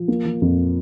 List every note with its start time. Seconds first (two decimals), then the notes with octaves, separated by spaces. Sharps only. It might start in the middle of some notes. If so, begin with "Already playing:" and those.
Already playing: F3
0.08 A#3
0.25 F3
0.42 F2